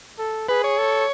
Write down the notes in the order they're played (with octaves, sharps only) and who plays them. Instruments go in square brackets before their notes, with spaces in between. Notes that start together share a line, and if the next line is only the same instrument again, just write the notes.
[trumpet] A4
[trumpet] G#4 [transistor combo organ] B4
[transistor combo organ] C#5
[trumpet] A4